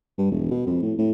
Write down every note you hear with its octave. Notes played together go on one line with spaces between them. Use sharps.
G2
E1
B2
F2
A2
A2